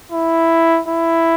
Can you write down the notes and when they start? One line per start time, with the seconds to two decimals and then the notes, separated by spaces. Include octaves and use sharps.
0.12 E4
0.88 E4